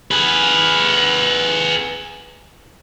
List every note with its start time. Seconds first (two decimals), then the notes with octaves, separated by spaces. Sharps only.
0.11 G#4 B4